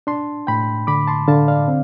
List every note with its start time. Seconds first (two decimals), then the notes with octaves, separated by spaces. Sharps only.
0.07 D4 A5 C6
0.47 A2 G5 B5
0.87 D3 B5 D6
1.07 A5 C6
1.28 D3 F5 A5
1.48 D5 F5
1.68 C4